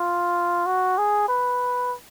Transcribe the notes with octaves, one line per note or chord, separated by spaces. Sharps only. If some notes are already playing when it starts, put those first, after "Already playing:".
Already playing: F4
F#4
G#4
B4